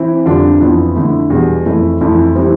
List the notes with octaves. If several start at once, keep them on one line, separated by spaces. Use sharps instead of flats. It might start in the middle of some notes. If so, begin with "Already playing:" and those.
Already playing: E3 C4 E4
F2 D3 G3 D4 F4
F2 E3 B3 F4
F2 D3 A3 E4
E2 B2 G3
F2 E3 A3 E4
F2 E3 A3 E4
E3 G3 C4